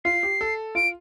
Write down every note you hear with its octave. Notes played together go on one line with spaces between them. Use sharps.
F4 C7
G4
A4
F4 D7